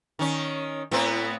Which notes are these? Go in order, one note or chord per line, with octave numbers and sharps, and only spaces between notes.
D#3 C#4
A2 B3 C4